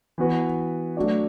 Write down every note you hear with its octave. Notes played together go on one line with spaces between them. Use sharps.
E3 B3 F#4 B4
F#3 A3 D4 F#4 D5